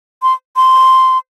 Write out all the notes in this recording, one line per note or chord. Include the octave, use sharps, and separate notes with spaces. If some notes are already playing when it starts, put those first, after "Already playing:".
C6
C6